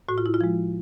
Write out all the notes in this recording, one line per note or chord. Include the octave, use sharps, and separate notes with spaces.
A2 F#4
F4
E4
F4
F3 G#3